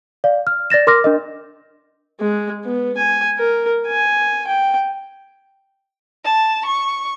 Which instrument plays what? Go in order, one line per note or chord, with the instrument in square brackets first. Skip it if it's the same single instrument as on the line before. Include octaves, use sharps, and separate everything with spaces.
[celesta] D5 F5
F6
D5 A6 A#6 E7
A#4 C6 D6 F6 A#6
D4 A#4 D#5
[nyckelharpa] G#3
B3
G#5
A#4
G#5
G5
[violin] A5
C#6